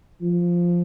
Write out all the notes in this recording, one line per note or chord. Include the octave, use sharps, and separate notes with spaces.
F3